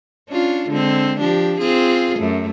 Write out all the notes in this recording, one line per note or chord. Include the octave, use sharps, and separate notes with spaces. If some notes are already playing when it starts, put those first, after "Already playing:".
C#4 D4 F4
D3 G#3 C4
F3 D4 G4
C4 F4 G#4
F#2 A3